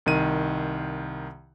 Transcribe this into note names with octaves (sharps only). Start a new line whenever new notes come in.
C2 D#3 D#7